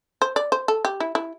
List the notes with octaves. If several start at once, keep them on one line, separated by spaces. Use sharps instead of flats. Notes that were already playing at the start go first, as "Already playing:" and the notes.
C5
D5
C5
A4
G4
E4
E4